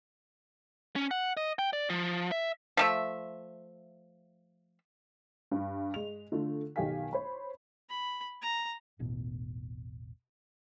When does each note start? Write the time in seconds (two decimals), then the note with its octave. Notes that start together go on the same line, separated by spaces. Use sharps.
0.96 C#4
1.11 F#5
1.37 D#5
1.59 G5
1.73 D5
1.90 F3
2.32 E5
2.77 F3 A3 E5
5.52 G2
5.94 G#3 F7
6.32 D3 A3 F4
6.76 B1 D#3 G4 F5 G#5 B6
7.13 C5 C#5 B5
7.90 B5
8.42 A#5
8.99 E1 A1 B2